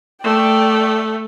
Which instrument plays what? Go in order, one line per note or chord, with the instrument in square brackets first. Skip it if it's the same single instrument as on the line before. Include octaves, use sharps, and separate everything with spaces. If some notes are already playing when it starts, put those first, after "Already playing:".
[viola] A3 [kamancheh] D5 G5